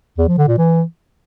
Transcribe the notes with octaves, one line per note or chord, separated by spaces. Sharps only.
E2
F3
D3
A#2
E3